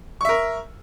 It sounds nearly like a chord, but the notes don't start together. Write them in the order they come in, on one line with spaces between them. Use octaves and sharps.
C#6 E5 A#4